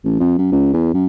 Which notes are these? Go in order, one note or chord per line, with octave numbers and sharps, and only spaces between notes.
A1
F2
F#2
C#2
E2
F#2